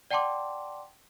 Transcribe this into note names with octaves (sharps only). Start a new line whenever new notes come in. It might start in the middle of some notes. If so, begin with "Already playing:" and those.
D5 F#5 G5 A5 C6 D6